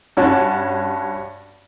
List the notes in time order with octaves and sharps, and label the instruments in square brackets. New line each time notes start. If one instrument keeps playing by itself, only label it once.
[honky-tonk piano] G2 C#4 F#4 A5